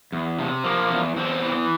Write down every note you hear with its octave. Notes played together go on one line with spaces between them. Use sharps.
E2
C3
F3 A#3
E2
E2 C4
E3